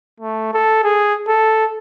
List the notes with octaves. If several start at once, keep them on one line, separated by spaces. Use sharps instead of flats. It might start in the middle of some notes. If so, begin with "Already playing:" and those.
A3
A4
G#4
A4